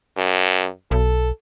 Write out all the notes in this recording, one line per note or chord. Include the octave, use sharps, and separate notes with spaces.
F#2
B1 A4